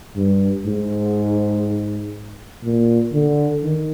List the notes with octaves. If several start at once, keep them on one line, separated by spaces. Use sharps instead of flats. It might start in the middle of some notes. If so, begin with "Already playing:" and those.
G2
G#2
A#2
D3
D#3